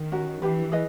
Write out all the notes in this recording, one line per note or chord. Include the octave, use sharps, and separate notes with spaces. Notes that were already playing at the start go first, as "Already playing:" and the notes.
Already playing: D#3
C#4 F#4 A#4
E3 D4 G4 B4
G#4 B4 D#5